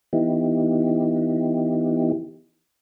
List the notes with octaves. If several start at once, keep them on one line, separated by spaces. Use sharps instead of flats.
E3 B3 D#4 E4 G4